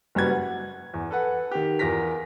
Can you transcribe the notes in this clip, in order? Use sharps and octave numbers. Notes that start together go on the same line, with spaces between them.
F#1 G3 F#4 B4 G#6
F#5
E2
A4 B4 F#5
D#3 G4
E2 F4 A#4 A#6 B6